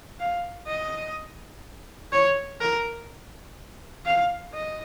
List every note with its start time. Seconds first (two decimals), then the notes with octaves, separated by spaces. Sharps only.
0.20 F5
0.67 D#5
2.12 C#5
2.60 A#4
4.05 F5
4.54 D#5